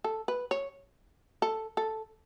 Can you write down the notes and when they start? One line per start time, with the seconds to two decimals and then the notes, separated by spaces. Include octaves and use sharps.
0.04 A4
0.28 B4
0.51 C#5
1.42 A4
1.77 A4